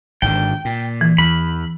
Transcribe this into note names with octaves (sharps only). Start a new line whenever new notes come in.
G#1 G#2 D3 G5
A#2
E3
E2 B5